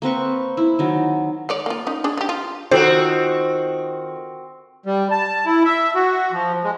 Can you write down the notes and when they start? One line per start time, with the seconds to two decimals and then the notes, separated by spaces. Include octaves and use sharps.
0.02 A#3 C4 B4 C#6
0.57 E4
0.79 D#3 F#3
1.49 G#3 C#5 D5
1.66 A#3 F4
1.87 C#4 D#4
2.04 D4 G#4
2.17 F3 G4
2.29 F4
2.71 D#3 C4 F4 F#4 A4 C5 D6
4.86 G3
5.11 A5
5.46 E4
5.65 E5
5.95 F#4
6.32 F3
6.64 G#3